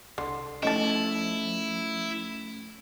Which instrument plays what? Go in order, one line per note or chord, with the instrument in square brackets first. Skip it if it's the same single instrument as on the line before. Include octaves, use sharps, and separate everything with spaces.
[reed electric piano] C2 C6 [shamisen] D3
[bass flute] F3 [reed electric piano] A3 C#4 [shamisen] D#4 A5 [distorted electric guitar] E4